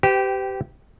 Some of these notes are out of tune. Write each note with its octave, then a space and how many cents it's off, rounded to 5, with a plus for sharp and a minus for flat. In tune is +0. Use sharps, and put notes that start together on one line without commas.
G4 -15 B4 +45 G5 +0